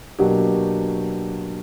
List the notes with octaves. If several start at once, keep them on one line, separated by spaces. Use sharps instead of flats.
B2 F#3 A#3 D4 G4